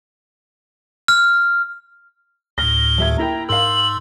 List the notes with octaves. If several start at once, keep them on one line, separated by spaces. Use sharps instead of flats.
F6
D2 A2 F6 A#6 G7
D#1 E5 G#6
A#3 E4 G5 A#5
G#2 A#4 F5 C6 E6 F#7